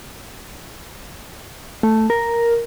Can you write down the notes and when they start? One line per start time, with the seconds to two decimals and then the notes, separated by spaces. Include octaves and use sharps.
1.83 A3
2.10 A#4